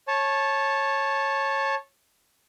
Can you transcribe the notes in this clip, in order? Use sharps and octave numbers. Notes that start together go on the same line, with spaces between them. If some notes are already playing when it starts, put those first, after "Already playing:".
C#5 A5